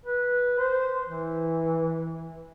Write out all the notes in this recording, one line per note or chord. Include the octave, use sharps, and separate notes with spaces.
B4
C5
E3